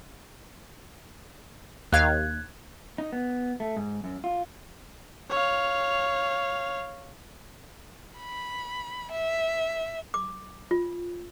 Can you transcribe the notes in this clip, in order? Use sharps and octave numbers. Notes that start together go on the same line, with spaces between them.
D#2 F5 F#6 G#6
D#4
B3
A3
G#2
F#2
F4
C#5 F5
B5
E5
D6
F4